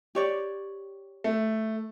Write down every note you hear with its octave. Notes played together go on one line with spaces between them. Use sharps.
G4 C#5 D5
A3